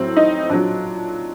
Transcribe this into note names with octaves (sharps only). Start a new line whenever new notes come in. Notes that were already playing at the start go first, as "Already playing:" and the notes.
Already playing: A2 F#3 C4
D#4
A#2 F#3 D4